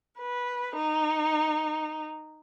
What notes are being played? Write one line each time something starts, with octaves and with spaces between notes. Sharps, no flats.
B4
D#4